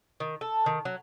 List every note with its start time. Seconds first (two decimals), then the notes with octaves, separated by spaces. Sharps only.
0.20 D#3
0.41 A4
0.66 D#3
0.85 F#3